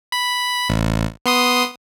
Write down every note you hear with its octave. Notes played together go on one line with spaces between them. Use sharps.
B5
A1
B3 C6 D#6